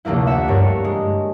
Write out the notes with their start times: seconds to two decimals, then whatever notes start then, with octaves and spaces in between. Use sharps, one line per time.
0.05 F1 D2 A3 A#3 E4
0.27 E5 F#5 E7
0.48 G2 D4 A#4 C#5
0.84 G#3